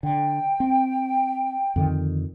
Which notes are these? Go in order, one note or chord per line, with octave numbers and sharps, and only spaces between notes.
D3 G5
C4
F2 D3 D#3